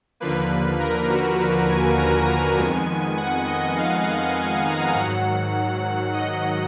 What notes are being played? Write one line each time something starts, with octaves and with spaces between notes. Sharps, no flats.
D#2 D3 F3 A#3 B4
A#4
F#4
B4
G#5
A#5
F2 D#3 G#3 B3 G#5
F#5
D#5
F5
F#5
G#5
A#5
G#2 D#3 F#3 F#5
D#5